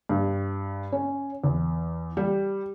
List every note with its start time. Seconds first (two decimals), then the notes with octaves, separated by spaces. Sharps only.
0.09 G2
0.92 C#4
1.44 E2
2.17 G3